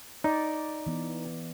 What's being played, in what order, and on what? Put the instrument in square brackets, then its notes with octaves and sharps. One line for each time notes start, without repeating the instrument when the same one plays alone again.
[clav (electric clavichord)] D#4 [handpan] D5
[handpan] E3 B3